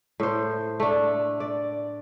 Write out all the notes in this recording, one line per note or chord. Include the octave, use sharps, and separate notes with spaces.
A2 C5
A3 D4
D5